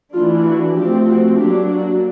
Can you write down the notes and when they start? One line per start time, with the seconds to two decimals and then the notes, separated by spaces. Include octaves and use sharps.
0.12 E3 A3 D4 F4
0.43 F#4
0.75 F3 A3 C4 G4
1.06 F#4
1.37 F#3 A#3 D4 G4
1.68 F#4